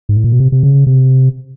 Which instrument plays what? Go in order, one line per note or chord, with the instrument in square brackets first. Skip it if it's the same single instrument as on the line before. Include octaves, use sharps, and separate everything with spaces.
[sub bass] G#2
A2
A#2
B2
C3
C3
C#3
C3